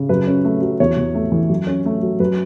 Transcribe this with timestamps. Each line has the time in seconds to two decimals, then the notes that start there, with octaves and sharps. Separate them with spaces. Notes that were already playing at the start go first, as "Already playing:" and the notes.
Already playing: C#3
0.09 F#2 B4
0.27 C#4
0.45 A3
0.62 F#3
0.80 E2 C#5
0.97 E2
1.15 A3
1.32 E3
1.49 F#2
1.67 C#4
1.86 A3
2.03 F#3
2.20 F#2 B4